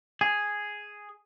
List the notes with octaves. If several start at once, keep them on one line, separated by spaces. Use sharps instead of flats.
G#4